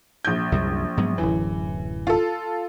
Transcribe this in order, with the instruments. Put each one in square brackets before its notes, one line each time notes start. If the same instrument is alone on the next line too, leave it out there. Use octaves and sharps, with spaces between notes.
[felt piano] A#1 G6
[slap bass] C2 F#2 G3
G#2 F#3 B3
[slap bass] D1 F#2 F#3 [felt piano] E3
[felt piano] F4 A4